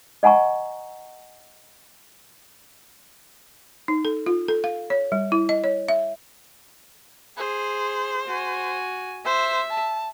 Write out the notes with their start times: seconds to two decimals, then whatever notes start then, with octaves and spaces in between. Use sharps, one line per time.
0.23 D#5 F#5 G#5 A#5 C#6
3.88 D#4
4.05 A4
4.26 F4
4.48 A4
4.64 F5
4.90 C#5
5.12 G3
5.32 E4
5.49 D#5
5.64 C#5
5.88 E5
7.37 G#4 C5
8.27 F#4 G#5
9.25 C5 E5
9.70 A5